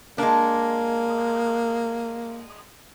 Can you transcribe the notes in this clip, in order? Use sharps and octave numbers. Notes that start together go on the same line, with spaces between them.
G#3 A#3 D4